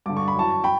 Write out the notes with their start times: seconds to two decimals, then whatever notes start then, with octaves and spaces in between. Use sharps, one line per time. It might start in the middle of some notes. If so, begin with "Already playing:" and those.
0.06 G2 D3 D6
0.17 C#6
0.28 B5
0.34 F#2 E3 A5 C#6
0.64 G5 B5